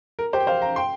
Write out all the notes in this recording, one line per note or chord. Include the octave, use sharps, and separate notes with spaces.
A#4
G4 C5
G5
C5 F5
F5 A#5
G5 C6